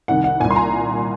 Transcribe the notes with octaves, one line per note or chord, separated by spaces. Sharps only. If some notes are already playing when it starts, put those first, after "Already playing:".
C2 C3 D#3 F#5
F#5
C2 A#2 G#5
C6
A#5